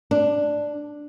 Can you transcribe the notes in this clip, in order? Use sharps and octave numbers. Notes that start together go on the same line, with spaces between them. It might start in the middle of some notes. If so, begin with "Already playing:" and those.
D4